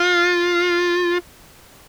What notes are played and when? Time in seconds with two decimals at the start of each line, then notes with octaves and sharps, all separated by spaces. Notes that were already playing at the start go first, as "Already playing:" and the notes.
Already playing: F4